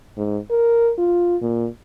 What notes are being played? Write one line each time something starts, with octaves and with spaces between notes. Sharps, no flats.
G#2
A#4
F4
A#2